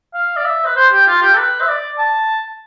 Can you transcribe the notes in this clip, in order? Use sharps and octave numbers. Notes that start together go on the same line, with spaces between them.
F5
D5
E5
B4
C5
G4
F4
G4
A4
B4
E5
D5
A5